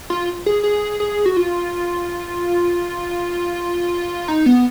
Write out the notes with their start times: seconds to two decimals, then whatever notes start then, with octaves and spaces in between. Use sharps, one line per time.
0.10 F4
0.46 G#4
0.63 G#4
1.00 G#4
1.26 F#4
1.37 F4
4.28 D#4
4.46 B3